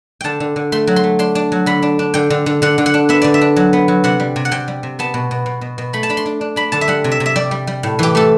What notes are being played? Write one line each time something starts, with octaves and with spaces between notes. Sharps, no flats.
D3 G5 A5
D3
D3
A3 C6
F#3
C6
A3
D4 C6
D4
F#3
D3 B5
D4
D4
D3 G5
D3
D3
D3 F#5
D3
F#5
D4
B3 E5
D3 D5
E5
D4
F#3
B3
F#3
C3 F#5
G3
C3
F#5
C3 G5
G3
C3
B3 A5
B2
B2
B2
B2
B2
A3 B5
A5
D4 B5
C6
D4
D4
D4 B5
D3 A5
E5
G3 F#5
C3
E5
C3
E5
G3 D5
G3
G3
A2
E3 G4
A3 A4